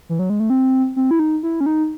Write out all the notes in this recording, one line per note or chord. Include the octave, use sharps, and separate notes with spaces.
E3
F#3
G#3
A3
C4
C4
E4
D#4
E4
C#4
D#4